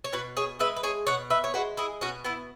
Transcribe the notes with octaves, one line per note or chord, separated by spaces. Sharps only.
C#5
B2 F#4 B4
G#4 C#5
G#3 B4 E5
B4
G#4 C#5
B2 C#5 F#5
B4 E5
C#5
G#3 F#4 B4
E4 G#4
B2 C#4 F#4
B3 E4